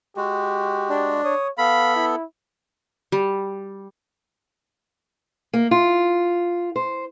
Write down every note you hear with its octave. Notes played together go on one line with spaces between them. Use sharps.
G#3 F#4 G4
D4
C#5 D#6
B3 A4 F5 B5
E4
G3
A#3
F4
C5